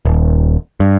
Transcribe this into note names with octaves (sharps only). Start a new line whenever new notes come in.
D#1
G2